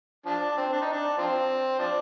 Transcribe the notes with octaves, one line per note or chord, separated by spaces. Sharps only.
F3 D4
C4
D4
D#4
D4
F3 C4
F3 D4